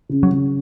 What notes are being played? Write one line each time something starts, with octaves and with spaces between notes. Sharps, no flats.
C#3
F#3
C#3